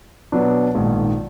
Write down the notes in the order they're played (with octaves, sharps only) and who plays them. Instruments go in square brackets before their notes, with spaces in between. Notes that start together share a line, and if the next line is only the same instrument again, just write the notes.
[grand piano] B2 F#3 B3 D4
A#1 G#2 D#3